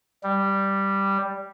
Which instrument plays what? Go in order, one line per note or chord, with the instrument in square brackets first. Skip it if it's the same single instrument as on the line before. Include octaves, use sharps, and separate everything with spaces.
[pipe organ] G3